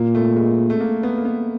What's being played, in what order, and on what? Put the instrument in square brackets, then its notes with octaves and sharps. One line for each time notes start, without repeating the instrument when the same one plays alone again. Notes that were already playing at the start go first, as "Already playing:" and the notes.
Already playing: [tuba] A#2 [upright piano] A#3
[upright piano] A3
G#3
A3
A#3
B3
A#3
B3